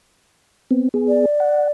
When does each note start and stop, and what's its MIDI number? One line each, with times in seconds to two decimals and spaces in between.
0.71 0.89 59
0.71 0.89 60
0.94 1.25 59
0.94 1.25 68
1.08 1.71 74
1.40 1.68 78